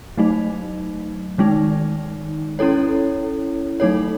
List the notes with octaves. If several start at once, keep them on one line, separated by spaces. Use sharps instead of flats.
F#3 A3 D#4
D#3 G#3 D#4
C#4 E4 A4 C#5
F#3 A3 D#4 A4 C#5